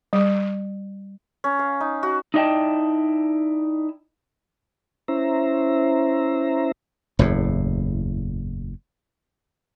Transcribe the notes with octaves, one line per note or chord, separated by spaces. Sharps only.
G3
C#4
F5
D#4
F#4
D#4 E4 D5 D#5 G5 A5
C#4 E4 C5 E5 A#5
F#1 E2 A2